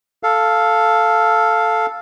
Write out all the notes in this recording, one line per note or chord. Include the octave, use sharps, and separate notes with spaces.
A4 F5